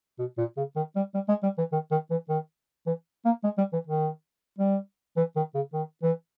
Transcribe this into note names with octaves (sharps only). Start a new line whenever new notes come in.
B2
A#2
C#3
D#3
G3
G3
G#3
G3
E3
D#3
D#3
E3
D#3
E3
A#3
G#3
G3
E3
D#3
G3
E3
D#3
C#3
D#3
E3